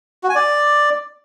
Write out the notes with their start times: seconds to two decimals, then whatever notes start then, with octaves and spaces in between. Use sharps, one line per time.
0.24 F#4
0.29 G#5
0.35 D5